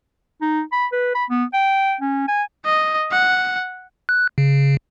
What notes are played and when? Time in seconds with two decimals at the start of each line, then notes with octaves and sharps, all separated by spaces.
0.42 D#4
0.72 B5
0.92 B4
1.15 B5
1.30 B3
1.53 G5
2.01 C#4
2.28 G#5
2.66 D#5
3.12 F#5
4.09 F#6
4.38 C#3